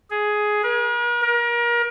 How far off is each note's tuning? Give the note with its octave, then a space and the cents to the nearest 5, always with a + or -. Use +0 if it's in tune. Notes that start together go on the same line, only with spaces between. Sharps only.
G#4 +10
A#4 +45
A#4 +30